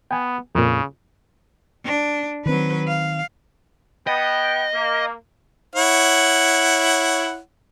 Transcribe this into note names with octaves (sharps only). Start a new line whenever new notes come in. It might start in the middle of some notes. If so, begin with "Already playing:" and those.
B3 G5 G#5
F2 A#2 C#3
D4
D#3 F#3 C4 B4
F5
B3 D#5 G5
A#3
E4 C#5 F#5